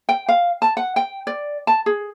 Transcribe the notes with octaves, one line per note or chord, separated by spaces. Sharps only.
G5
F5
A5
F#5
G5
D5
A5
G#4